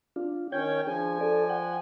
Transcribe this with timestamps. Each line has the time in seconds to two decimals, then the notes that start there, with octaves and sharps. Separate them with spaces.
0.16 D4 F4
0.52 D#3 C#4 C#5 G5 G6 G#6
0.87 F3 D4 G#4 G#5
1.21 A4 D5
1.49 F#5 G5